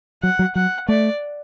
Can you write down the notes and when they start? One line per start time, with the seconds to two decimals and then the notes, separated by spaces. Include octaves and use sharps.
0.23 F#3 F#5
0.39 F#3
0.55 F#3 F#5
0.88 A3 D5